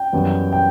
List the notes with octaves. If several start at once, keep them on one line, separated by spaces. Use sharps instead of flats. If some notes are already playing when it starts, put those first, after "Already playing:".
Already playing: G5
F#2 E3 G3 B3
G5